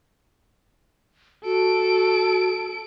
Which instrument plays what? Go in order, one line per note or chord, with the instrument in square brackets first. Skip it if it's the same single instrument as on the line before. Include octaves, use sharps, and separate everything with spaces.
[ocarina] F#4 [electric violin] A4 D7